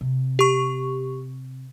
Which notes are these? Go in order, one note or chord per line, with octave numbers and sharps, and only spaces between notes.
C3
G4 C#6